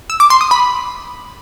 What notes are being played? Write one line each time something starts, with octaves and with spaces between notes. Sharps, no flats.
E6
D6
C6
D#6
B5